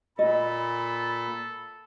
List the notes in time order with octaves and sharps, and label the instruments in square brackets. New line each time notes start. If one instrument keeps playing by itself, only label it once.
[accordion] A#2 [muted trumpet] A4 [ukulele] D#5 [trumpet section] B5